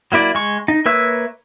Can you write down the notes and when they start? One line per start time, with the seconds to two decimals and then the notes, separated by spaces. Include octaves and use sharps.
0.12 F#3 A#3 E4 D5
0.35 G#3 C#6
0.68 D#4
0.85 A#3 B4 C#5 E5 E6